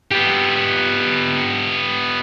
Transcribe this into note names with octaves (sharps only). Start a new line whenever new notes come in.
B3 G4